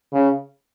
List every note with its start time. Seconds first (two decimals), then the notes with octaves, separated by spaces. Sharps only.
0.13 C#3